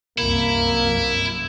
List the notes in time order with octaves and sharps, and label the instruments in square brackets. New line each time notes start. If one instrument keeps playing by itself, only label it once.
[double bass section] C2 F#2 [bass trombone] A#3 [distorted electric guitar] E4